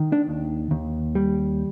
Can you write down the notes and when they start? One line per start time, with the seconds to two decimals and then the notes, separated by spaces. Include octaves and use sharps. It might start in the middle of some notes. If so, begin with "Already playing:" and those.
Already playing: D#3
0.12 D4
0.27 D#2
0.71 D#2
1.15 G3